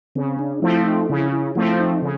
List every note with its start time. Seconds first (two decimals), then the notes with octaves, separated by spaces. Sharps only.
0.15 C#3 C4
0.39 D4
0.62 F3 A3 C4 E4
0.86 D#4
1.09 C#3 E4
1.32 E4
1.55 F3 A3 C4 E4
1.79 D#4
2.02 C#3